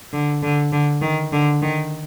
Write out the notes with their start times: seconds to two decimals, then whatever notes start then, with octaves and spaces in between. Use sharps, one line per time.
0.13 D3
0.43 D3
0.72 D3
1.02 D#3
1.33 D3
1.62 D#3